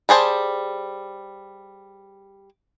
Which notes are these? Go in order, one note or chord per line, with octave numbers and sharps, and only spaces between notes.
G3 G#4 C5 A5